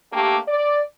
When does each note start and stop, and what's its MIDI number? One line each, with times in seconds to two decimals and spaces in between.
0.13 0.38 57
0.13 0.38 58
0.13 0.38 62
0.13 0.38 67
0.48 0.81 74